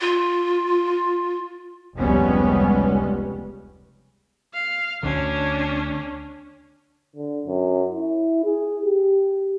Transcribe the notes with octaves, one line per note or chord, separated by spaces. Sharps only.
F4
F1 C#2 G3 G#3 B3 C#4
F5
D2 D3 C#4 D4
D3
F#2
E4
G#4
G4